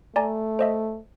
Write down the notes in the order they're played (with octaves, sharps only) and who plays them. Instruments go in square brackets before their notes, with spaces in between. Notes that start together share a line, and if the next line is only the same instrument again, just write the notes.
[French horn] A3 [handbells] D5 G#5 A#5
[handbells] C5 D#5 E5